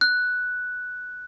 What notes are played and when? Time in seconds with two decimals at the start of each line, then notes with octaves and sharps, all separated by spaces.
0.01 F#6